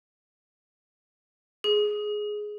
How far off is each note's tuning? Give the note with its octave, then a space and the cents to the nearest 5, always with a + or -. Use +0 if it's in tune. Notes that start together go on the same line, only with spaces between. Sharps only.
G#4 +10